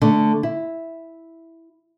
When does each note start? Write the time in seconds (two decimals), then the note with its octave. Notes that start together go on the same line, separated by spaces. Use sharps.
0.02 D3 A3
0.43 E4